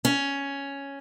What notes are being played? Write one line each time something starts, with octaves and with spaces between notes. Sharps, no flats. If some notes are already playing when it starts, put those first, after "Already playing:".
C#4